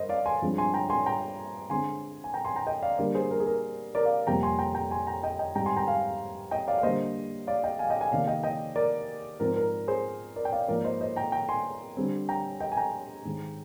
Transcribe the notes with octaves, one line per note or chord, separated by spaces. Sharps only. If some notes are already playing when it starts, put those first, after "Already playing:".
Already playing: G2 A#4 C5 D#5
D5 F5
G#5 C6
G2 F3 G#3 C4
G#5 C6
G5 A#5
G#5 C6
G5 A#5
D3 G#3 C4 G#5 C6
G#5
G5 A#5
G#5 C6
G5 A#5
D#5 G5
D5 F5
D3 G3 A#3 A#4 D5
G#4 C5
A#4
G#4
A#4
A#4 D5
D5 F5
F2 C3 G3 A#3 G5 A#5
G#5 C6
G5 A#5
G5 A#5
G#5 C6
G5 A#5
D#5 G5
D#5 G5
G#2 G3 C4 G5 A#5
G#5 C6
G5 A#5
F5 G#5
D#5 G5
D5 F5
F5
D3 G3 A#3 C5 D#5
D5 F5
D#5 G5
F5 G#5
D#5 G5
F5 G#5
C3 D#3 A#3 D5 F5
D#5 G5
D#5 G5
A#4 D5
G#2 F3 C4 A#4
A#4
G#4 C5
A#4 D5
G5
D5 F5
G#2 F3 A#3 A#4 D5
C5 D#5
C5 D#5
G5 A#5
G5 A#5
G#5 C6
D3 G3 C4
G5 A#5
D#5 G5
G#5
G5 A#5
G#2 D#3 G#3